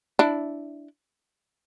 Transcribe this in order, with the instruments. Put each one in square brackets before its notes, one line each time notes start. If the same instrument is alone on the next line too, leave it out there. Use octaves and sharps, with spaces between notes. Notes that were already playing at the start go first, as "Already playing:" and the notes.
[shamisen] D4 E4